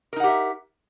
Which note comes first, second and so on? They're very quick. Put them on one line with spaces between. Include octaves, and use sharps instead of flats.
A#4 D#4 F#5 G4 E5